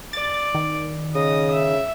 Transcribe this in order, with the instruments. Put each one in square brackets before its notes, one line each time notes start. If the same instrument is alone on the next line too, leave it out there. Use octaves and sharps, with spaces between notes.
[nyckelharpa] D5 [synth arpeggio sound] A6
[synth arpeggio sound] D#3
[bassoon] C#3 [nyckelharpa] D#5 D#6
[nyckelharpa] E5